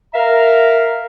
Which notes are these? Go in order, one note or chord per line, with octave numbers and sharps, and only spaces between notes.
A#4 E5 F5 A#5